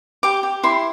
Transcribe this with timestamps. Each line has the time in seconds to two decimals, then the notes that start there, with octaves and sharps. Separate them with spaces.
0.23 G4 D6
0.43 G4
0.63 E4 C6